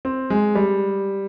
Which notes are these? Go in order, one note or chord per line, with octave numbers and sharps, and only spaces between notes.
C4
G#3
G3